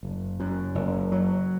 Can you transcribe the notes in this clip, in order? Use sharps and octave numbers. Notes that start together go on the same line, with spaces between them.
F#1
F#2
F#1
F#3